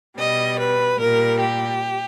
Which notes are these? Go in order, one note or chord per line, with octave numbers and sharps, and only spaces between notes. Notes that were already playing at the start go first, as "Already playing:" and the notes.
B2 G3 D#5
B4
A#2 G3 A#4
G4